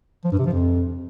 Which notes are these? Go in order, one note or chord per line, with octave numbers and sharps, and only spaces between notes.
F3
G2
C3
F3
F2